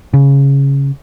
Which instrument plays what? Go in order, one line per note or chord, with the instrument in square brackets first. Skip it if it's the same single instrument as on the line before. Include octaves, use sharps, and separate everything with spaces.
[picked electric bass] C#3